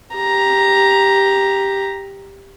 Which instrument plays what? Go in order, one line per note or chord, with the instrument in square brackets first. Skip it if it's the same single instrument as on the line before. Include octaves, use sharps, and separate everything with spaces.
[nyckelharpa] G4 A#5